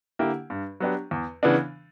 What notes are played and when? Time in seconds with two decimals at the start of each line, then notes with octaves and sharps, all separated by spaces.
0.19 D3 A#3 E4 G4
0.50 G2
0.80 F#3 B3 D4 G4
1.11 E2
1.43 C#3 E3 B3 D4